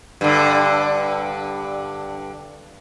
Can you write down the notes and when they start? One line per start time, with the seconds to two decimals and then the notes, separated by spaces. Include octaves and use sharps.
0.21 G2 D3